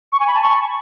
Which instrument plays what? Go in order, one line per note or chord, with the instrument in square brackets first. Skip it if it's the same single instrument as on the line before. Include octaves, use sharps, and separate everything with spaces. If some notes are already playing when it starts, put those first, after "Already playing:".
[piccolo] C#6
G#5
B5
A5
C#6